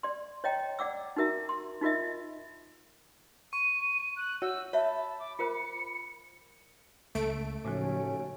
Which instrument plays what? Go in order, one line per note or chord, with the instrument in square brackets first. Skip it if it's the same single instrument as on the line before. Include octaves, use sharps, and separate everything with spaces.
[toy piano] D5 C6
C#5 D#5 G5 A#5
D5 F#5 D6 E6
D#4 F#4 A#4 E5 A#5
C6
D#4 F4 A#4 D#5 E5
[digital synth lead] C#6 [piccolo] D#7
[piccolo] F#6
[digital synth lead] F#4 [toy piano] C#5 [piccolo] E6
[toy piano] C#5 E5 [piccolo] A5 [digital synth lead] B5
[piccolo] D6
[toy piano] F4 A#4 C5 [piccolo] C#7
[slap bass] C#2 [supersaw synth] A3 D7
[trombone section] D#2 F#3 C#4 [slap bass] A2 [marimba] C#3 F3